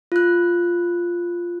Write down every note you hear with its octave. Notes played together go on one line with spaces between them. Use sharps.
F4 F#6